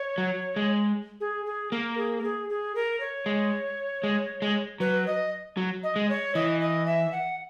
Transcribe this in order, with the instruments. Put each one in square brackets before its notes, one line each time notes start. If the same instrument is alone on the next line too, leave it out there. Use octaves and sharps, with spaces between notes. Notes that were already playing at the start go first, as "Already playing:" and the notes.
Already playing: [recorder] C#5
[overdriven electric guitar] F#3
G#3
[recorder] G#4
G#4
[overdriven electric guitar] A#3 [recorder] A#4
[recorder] G#4
A#4
G#4
G#4
A#4
C#5
[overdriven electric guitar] G#3
G#3
G#3
[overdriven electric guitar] F#3 [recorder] B4
[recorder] D#5
[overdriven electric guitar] F#3
[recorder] D#5
[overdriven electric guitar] G#3
[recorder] C#5
[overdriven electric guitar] E3 [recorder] D#5
[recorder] D#5
E5
F#5